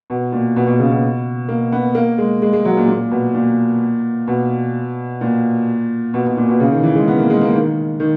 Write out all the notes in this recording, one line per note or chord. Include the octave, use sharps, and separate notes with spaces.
B2
A#2
B2
B2
C#3
B2
A#3
B3
A#3
G#3
G#3
G#3
F#3
A#2
A#2
B2
A#2
B2
A#2
B2
B2
A#2
B2
C#3
D#3
E3
G#3
B3
A#3
G#3
A#3
D#3
D#3